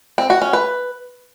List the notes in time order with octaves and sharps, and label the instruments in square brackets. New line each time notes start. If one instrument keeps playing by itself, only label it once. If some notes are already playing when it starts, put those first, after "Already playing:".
[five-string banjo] C4
F#4
C#4
B4